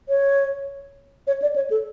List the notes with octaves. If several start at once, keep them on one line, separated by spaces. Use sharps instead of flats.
C#5
C#5
D5
C#5
A4